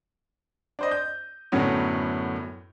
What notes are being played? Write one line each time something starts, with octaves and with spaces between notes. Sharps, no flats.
D4 C5 D#5
G6
F#2 A2 D3 F#3 B3 C#4